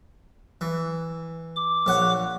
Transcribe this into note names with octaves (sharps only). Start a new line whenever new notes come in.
E3
D6
A#1 C#5 F#5